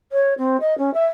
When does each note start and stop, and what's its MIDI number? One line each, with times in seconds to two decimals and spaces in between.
0.12 0.34 73
0.38 0.57 60
0.60 0.77 75
0.78 0.93 61
0.94 1.05 76